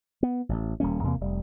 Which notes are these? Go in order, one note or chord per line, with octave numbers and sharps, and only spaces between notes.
B3
A1
D#1 G3 A#3 C#4
E2 C3 A#3
F1 G3